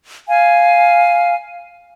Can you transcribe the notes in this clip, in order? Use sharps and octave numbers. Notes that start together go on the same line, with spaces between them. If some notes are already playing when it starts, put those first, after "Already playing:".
F5 G#5